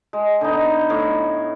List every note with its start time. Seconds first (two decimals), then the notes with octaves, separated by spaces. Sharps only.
0.13 G#3
0.41 D3 B3 D#4
0.90 A2 C#5